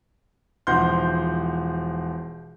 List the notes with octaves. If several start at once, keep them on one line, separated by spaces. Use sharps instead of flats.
E1 F3 D#4 F#5 C6 G6